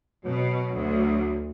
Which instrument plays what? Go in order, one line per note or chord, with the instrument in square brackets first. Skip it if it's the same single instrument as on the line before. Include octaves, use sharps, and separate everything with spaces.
[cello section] B2 [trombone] F#3
[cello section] D2